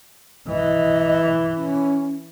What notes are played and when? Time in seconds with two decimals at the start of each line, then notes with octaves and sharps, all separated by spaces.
0.48 E3 D#5
1.57 C#4